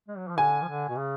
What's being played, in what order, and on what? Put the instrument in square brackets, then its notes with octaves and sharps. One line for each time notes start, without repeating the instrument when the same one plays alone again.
[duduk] G#3
F#3
F3
[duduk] D3 [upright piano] G#5
[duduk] F3
D3
B2
C#3